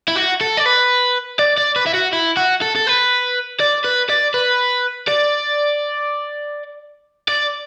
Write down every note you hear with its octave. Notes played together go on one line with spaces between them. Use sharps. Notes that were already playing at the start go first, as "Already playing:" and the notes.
E4
F#4
A4
D5
B4
D5
D5
B4
E4
F#4
E4
F#4
A4
A4
B4
D5
B4
D5
B4
D5
D5